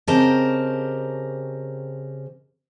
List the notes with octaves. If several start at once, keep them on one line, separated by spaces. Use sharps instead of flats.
C#3 C4 G4 A#4 D#5 A5